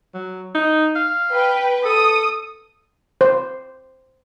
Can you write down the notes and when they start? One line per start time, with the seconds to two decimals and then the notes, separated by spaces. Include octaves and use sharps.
0.14 F#3
0.55 D#4
0.96 F5
1.31 B4 G5
1.85 A4 D#6
3.21 C5